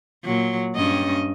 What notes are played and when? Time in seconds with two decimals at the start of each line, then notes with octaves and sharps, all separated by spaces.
0.25 A#2 F#3
0.76 G2 C#4 D#5